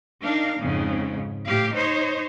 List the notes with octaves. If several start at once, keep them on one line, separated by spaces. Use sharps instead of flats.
D4 D#4 A#4 F5
F2 G#2 C#3
A2 G4 F5
D#4 C5 C#5